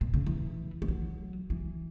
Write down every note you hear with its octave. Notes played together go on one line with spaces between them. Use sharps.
B2
C#3
E3
G#3
F#3
E3